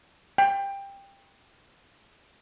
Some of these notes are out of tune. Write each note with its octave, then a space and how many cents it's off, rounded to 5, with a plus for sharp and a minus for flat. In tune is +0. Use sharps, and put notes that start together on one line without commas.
G5 +15